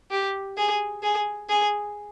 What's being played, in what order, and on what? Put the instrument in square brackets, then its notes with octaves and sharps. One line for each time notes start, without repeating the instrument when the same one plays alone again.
[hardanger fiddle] G4
G#4
G#4
G#4